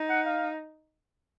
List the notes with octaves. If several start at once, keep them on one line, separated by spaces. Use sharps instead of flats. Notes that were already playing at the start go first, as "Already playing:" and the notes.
Already playing: D#4
F#5
F5